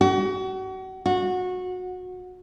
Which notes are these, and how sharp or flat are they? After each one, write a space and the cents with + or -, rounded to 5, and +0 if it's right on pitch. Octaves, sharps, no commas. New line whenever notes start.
F#4 +35
F#4 -20